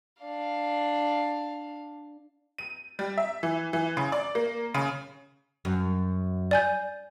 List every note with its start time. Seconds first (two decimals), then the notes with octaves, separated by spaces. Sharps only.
0.22 D4 F5
2.58 D#7
2.99 G3
3.18 E5
3.43 E3
3.73 E3
3.97 C#3
4.12 D5
4.35 A#3
4.74 C#3
5.65 F#2
6.51 D5 G#5 G6